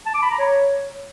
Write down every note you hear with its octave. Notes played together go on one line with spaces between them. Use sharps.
A5
D6
B5
A#5
C#5